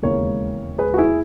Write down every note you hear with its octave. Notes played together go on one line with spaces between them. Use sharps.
E1 D#2 C#3 E3 G#3 A#4 C#5
G#4 B4
F#4
E4 G#4